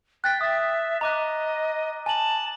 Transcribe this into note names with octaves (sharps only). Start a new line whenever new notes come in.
G5 F#6 A6 B6
E5 D#6 A6
D#5 A#5 D6 F#6
G#5 A5 F#7